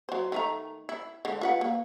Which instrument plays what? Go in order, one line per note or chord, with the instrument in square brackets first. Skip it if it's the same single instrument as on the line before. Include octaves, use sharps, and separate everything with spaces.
[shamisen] F#3 C5
D#3 A3 A#5
E4
D3 G#3
F4 B4 F#5
A#3